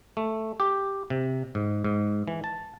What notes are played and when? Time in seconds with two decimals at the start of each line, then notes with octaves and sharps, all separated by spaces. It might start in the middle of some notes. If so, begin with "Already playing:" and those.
0.17 A3
0.60 G4
1.10 C3
1.55 G#2
1.84 G#2
2.28 E3
2.44 A5